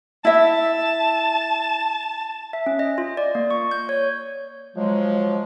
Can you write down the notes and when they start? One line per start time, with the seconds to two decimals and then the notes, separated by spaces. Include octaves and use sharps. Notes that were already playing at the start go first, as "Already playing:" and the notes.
0.25 E4 E5 A5
2.53 E5
2.66 C#4
2.79 D#5
2.98 F4
3.17 D5
3.35 A#3
3.51 C#6
3.71 G6
3.89 C#5
4.76 F3 F#3 G#3